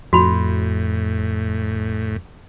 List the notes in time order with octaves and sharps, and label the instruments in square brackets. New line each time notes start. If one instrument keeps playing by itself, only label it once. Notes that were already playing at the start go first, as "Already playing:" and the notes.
[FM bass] F2 [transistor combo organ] A2 [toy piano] F#4 B5